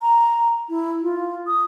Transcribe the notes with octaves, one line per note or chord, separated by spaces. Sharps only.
A#5
E4
F4
D#6